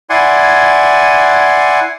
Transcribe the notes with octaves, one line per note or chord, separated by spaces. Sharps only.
E4 D5 F#5 G#5 C6